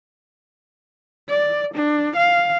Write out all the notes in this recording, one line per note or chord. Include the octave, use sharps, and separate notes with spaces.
D5
D4
F5